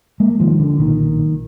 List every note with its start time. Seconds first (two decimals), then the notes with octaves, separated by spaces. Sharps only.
0.20 G#3 A#3
0.40 D#3 F3
0.59 D3
0.79 B1 A#2 D#3